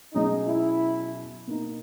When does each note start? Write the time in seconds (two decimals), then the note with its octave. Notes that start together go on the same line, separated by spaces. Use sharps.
0.14 B2 F#3 C#4 D#4 G#4
0.48 E4
1.47 B2 A#3 D#4